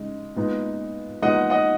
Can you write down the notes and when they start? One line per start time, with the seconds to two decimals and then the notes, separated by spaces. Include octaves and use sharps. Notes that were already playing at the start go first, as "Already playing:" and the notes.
Already playing: C#3 G#3 D#4
0.36 A#2 G#3 B3 D#4
1.22 A#2 G#3 B3 D#4 D#5 F#5
1.50 D#5 F#5